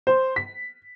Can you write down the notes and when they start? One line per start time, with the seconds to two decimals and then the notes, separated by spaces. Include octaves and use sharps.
0.07 C5
0.36 B6